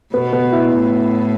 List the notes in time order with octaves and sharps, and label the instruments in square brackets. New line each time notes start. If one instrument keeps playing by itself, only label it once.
[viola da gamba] B2 [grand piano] B3
[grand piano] B3
E4
[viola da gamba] A2